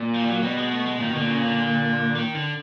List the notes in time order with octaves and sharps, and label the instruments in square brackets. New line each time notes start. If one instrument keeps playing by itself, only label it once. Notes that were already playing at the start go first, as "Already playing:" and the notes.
Already playing: [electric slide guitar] A#2
[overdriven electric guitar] F3
G3
F#3
[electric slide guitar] B2 [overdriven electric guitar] G3
[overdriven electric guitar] G#3
A3
G#3
[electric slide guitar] A#2 [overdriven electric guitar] D#3
[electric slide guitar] B2
[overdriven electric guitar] D3
[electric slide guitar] A#2
[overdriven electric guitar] C#3
D3
D#3
D3